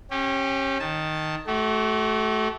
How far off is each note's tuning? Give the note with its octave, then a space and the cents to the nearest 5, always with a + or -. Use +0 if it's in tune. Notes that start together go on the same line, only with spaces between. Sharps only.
C#4 -30 G4 +0
D#3 +0 A5 +0
A3 -20 F#4 +35